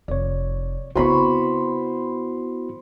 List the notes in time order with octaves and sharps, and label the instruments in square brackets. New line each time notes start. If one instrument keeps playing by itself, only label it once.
[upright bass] F1 [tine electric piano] C#5 D5
[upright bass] C#3 C4 [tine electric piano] B3 E4 F#4 [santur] C5 B5 C#6